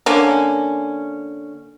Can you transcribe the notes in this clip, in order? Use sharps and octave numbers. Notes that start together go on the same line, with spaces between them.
D3 A#3 C#4